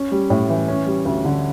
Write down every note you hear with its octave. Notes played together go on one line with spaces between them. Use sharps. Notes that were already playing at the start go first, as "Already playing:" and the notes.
Already playing: C#4
G3
A2
E3
C#4
G3
D2
D3